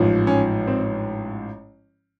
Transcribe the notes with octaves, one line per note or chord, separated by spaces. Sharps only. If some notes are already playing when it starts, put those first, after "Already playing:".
Already playing: A1 G#2 F3
C#4
C4